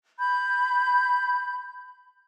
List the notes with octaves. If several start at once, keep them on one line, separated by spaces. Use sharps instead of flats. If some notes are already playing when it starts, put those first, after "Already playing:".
B5 G6